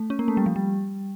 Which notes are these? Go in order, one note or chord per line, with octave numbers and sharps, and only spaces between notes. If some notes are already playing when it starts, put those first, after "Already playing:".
Already playing: A3
C#4
A#3
A3
G3
F3
G3